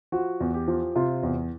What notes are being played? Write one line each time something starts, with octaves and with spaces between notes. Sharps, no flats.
F3 F#4
E2
G4
F3
C3 F4
E2